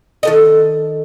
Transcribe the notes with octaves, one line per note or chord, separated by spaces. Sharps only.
D#3 A4 D#5